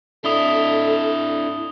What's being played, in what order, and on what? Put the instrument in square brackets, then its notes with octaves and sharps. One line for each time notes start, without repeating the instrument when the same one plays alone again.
[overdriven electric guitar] D4 E4 [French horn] A4 [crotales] D#6 G7